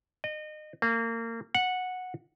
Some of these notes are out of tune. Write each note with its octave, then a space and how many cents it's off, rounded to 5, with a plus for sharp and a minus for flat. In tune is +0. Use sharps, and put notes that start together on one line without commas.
D#5 -30
A#3 -30
F#5 -10